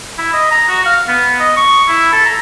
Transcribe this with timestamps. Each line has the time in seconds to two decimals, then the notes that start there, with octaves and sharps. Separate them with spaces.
0.18 E4
0.33 D#5
0.51 A#5
0.68 F#4
0.85 F5
1.08 B3
1.40 D#5
1.57 C#6
1.88 E4
2.12 A4
2.25 A#5